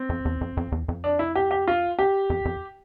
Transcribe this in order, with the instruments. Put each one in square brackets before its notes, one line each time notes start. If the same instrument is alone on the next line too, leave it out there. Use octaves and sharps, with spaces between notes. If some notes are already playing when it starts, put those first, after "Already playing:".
Already playing: [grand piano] C4
[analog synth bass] F2
E2
F2
F2
E2
F2
[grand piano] D4
E4
G4
G4
F4
G4
[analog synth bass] F2
F2